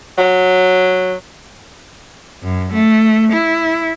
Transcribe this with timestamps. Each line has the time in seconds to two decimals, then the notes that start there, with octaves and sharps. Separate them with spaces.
0.18 F#3
2.42 F#2
2.73 A3
3.33 E4